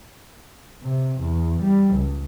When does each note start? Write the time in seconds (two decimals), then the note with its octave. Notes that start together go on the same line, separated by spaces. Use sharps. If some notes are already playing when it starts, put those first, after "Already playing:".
0.82 C3
1.19 E2
1.61 G3
1.94 C#2